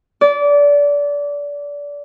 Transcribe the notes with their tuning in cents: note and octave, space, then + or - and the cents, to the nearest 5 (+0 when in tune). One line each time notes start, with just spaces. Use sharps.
D5 -25